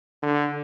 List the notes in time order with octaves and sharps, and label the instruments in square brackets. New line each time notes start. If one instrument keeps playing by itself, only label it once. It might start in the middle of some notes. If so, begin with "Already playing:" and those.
[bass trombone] D3